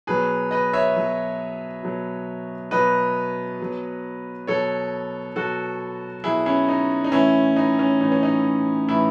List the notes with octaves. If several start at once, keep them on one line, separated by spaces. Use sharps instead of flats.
B2 F#3 G#4 B4
B4 D#5
C#5 E5
B2 F#3
B2 F#3
B2 F#3 B4 D#5
B2 F#3
B2 F#3 A4 C#5
B2 F#3 F#4 A4
B2 F#3 E4 G#4
C#4 E4
D#4
D#4
A2 E3 C#4 E4
D#4
C#4
A2 E3 D#4
C#4
D#4
A2 E3 E4